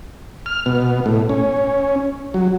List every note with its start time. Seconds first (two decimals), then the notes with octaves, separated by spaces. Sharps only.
0.46 F6
0.66 B2
1.06 A2
1.29 C#4
2.34 F#3